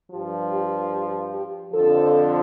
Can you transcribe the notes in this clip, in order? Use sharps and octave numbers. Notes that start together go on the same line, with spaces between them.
G2 F3 G4
G4
G4
G4
F2 D3 F3 A4